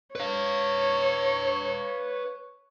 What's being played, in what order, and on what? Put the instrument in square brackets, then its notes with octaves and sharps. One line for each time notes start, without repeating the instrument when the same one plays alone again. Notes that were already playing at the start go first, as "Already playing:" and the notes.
[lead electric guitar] B4 F5 [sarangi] C#5